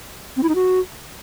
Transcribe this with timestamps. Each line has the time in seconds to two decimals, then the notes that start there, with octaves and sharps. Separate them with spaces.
0.37 C4
0.43 E4
0.49 D#4
0.55 F#4